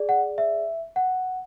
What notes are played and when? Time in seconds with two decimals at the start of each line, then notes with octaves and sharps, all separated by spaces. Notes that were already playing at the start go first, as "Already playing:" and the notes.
Already playing: G#4 D5
0.09 F#5
0.38 E5
0.96 F#5